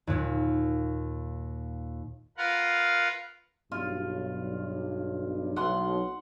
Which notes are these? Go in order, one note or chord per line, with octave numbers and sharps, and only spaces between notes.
D#2 A#2
F4 A#4 B4 F5 F#5
B1 G2 F4
B1 F#5 C6